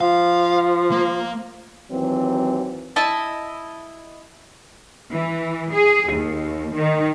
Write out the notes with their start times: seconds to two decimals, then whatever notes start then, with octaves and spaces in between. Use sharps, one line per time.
0.01 F3 F5
0.91 A#3
1.91 D#2 E3 F#3 C4
2.96 E4 D#5 A5
5.11 E3
5.73 G#4
6.12 D#2
6.76 D#3